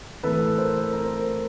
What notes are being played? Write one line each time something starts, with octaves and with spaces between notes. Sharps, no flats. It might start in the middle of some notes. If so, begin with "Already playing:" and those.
A2 E3 A4 B4
A#4 C5
A#4 C5